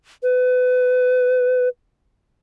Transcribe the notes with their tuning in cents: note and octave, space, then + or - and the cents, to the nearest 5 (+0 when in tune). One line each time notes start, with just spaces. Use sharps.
B4 +30